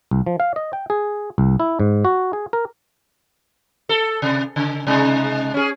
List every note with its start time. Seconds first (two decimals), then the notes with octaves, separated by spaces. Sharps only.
0.11 C2
0.26 F3
0.40 F5
0.56 D#5
0.73 G5
0.90 G#4
1.38 C2
1.60 E4
1.80 G#2
2.05 F#4
2.33 G#4
2.53 A#4
3.89 A4
4.22 C3
4.56 C#3
4.87 C3 G#3 D#4
5.54 C#4 G#4